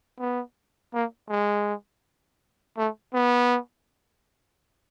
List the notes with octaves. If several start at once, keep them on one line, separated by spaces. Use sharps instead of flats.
B3
A#3
G#3
A3
B3